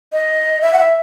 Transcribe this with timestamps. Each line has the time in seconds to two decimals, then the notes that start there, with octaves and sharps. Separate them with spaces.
0.13 D#5
0.62 E5
0.73 F#5
0.78 E5